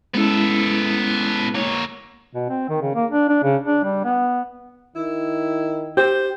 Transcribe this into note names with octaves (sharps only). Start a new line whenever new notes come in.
G#3 B3 C#4 E4 A4
A#3 C#5
B2
C4
D#3
C#3
A#3
D4
D4
C#3
D4
G3
B3
D#3 E4
G4 C5